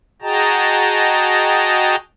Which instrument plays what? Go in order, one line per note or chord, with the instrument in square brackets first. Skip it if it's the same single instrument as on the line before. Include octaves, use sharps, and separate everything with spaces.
[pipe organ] F#4 G#4 D#5 G5 A5 A#5